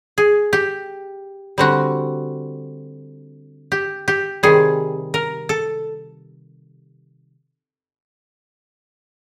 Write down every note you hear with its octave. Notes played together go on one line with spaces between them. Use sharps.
G#4
G4
D3 G3 C4 F#4
G4
G4
C3 D#3 G3 G#4
A#4
A4